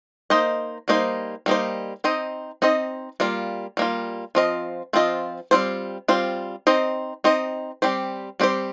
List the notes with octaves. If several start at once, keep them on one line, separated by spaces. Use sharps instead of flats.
A#3 D#4 C5 D#5
G3 A#3 D#4 C5
G3 A#3 D#4 C5
C4 D#4 C5 D#5
C4 D#4 C5 D#5
G3 A#3 F4
G3 A#3 F4
F3 C4 F4 D#5
F3 C4 F4 D#5
G3 C4 F4 C5
G3 C4 F4 C5
C4 D#4 C5 D#5
C4 D#4 C5 D#5
G3 C4 G4 C5
G3 C4 G4 C5